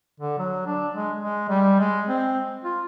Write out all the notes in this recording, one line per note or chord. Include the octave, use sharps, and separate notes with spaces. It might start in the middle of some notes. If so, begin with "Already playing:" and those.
D3
F#3
D4
G#3
G#3
G3
G#3
C4
F4